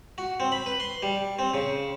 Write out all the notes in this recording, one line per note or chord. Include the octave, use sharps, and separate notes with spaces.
F#4
C4
B5
B4
C6
G3
C4
C#3